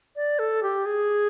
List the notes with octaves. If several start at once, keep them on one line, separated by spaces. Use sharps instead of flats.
D5
A4
G4
G#4